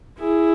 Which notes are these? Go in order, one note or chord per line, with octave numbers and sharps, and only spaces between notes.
E4 G#4